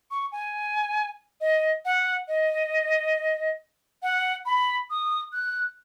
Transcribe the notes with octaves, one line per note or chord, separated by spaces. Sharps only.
C#6
G#5
D#5
F#5
D#5
F#5
B5
D#6
F#6